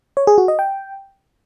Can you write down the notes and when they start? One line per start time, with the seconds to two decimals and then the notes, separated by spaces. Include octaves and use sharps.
0.17 C#5
0.27 G#4
0.38 F#4
0.48 D#5
0.59 G5